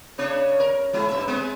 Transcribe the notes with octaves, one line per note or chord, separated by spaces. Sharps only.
C#3 D4 C#5
A#4
F#3 G#3 E4
G2 C#4 E5
G#3 B3 C4